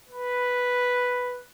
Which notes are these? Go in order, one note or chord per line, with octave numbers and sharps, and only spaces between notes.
B4